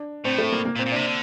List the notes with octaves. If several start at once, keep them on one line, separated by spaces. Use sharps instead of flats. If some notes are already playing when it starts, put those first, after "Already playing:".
Already playing: D4
A2 C4
A3
A#3
A#3
A#2
C4
A#2
C3 D4
D3